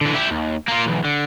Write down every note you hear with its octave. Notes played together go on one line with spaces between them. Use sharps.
D3 E3
E4 G4
D#2
A#3 F4
B1 E2
D3